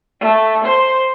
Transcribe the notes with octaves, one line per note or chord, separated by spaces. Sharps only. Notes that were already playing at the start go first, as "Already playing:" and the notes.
A3
C5